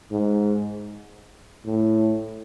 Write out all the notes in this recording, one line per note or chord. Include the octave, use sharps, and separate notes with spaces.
G#2
A2